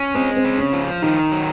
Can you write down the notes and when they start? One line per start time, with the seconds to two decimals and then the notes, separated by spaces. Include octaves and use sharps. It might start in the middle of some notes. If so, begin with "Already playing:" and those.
Already playing: C#4
0.14 G#3 C4
0.36 C4
0.45 C#3
0.58 C#4
0.73 F3
1.02 D#3 D#4
1.32 F#3